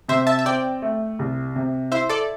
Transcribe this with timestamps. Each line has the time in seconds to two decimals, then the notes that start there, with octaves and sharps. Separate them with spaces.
0.08 C3 C5 E5
0.27 E5 A5
0.39 E5
0.45 C4 D5 G5
0.82 A3
1.19 C2
1.56 C3
1.92 E4 C5 E5
2.09 A4 D5